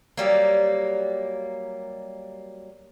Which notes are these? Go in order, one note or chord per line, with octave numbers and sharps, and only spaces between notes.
F#3 G3 A#3